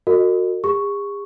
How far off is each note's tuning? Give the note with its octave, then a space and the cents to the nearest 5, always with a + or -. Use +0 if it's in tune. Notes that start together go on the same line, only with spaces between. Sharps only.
F#4 -15 A#4 -45 D#5 -25
G#4 -45 C#6 +0